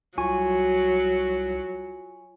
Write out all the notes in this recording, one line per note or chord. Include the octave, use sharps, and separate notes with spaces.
C2 F#3 F4 G#5 C#6